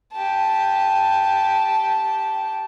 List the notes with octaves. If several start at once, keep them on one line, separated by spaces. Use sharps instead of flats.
G4 A5